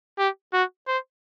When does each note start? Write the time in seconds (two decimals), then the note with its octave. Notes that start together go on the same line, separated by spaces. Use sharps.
0.19 G4
0.53 F#4
0.87 C5